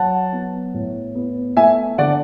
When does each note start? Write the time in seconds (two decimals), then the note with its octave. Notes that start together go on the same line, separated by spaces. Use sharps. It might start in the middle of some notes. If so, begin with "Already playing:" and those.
Already playing: F#3 F#5 A5
0.33 B3
0.74 A2
1.15 B3
1.57 A3 E5 G#5
1.98 D3 D5 F#5